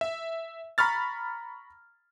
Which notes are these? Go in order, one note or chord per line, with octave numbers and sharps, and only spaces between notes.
E5
A#5 B5 C#6 F6 A6